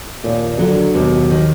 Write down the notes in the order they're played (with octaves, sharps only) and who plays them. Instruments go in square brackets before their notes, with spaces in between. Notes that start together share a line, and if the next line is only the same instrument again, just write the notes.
[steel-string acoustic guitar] D#2 [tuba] A#2
[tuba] D3 [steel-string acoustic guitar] F#3
[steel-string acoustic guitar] D#2 [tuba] B2
[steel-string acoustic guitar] D#3